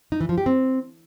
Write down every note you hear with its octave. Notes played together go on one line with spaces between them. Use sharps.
D#4
E3
F3
G4
C4